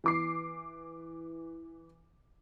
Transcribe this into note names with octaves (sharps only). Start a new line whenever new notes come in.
E3 D6 C7